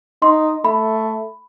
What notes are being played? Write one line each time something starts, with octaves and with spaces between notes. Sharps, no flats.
D#4 C6
A3 B5